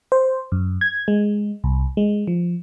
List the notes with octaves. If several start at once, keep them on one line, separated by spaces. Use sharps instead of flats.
C5
F#2
G#6
G#3
C2
G#3
F3